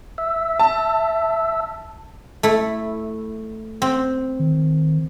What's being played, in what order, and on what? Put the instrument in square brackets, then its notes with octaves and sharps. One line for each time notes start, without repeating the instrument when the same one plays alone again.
[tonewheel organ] E5
[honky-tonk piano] A5
[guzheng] A3 E4
C4
[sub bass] D#3